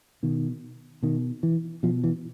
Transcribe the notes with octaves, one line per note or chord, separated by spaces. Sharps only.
B2 D#3
B2 D#3
E3
B2 F3
E3